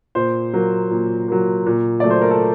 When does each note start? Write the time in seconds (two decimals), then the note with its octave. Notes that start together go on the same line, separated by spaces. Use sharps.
0.15 A#2 C5
0.53 F#3 A#3
0.91 A#2
1.28 F#3 A#3
1.66 A#2
2.00 F#3 A3 D5
2.10 C5
2.21 A#4
2.31 A4